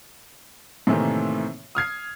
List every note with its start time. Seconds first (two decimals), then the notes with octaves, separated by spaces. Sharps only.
0.87 A2 C3 D#3 E3 A3 A#3
1.75 D#6 F6 G#6 C7